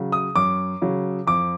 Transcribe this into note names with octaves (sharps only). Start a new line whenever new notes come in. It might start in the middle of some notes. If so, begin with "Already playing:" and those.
Already playing: C#3 F#3
D#6
F#2 D6
C#3 F#3
F2 D6